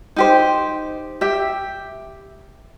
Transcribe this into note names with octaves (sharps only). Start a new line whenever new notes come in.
D#4 G4 C5
G4 E5